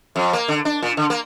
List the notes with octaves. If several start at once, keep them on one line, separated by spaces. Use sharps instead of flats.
F2
A#3
D3
D4
A#2
D3
A#3